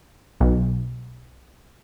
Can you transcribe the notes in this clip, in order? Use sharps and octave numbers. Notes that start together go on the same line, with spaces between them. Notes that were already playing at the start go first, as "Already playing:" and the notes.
B1